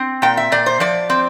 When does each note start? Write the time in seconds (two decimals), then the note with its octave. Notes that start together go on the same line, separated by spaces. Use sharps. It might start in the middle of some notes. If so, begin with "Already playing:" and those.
Already playing: C4
0.22 A#2 G5
0.37 E5
0.52 A#2 D5
0.66 C5
0.80 F3 D5
1.10 C4